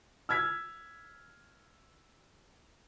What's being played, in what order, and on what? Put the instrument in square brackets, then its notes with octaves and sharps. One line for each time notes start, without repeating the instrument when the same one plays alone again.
[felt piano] E6 F6 G#6 B6